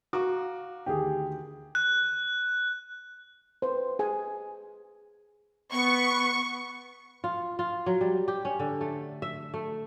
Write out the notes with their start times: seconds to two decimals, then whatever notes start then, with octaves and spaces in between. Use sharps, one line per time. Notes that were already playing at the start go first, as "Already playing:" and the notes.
0.13 F#4 F5 A#5 D6
0.86 D2 D3 D#3 G4 G#4
1.75 F#6
3.62 B4 C5
3.99 G#4 G#5
5.72 B3 C#6
7.24 F4
7.59 F4
7.86 F#3
8.01 G3
8.28 G4
8.45 C#4
8.59 D3
8.81 A3
9.22 E5
9.54 A3